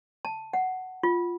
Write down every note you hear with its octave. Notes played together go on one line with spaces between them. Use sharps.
A5
F#5
F4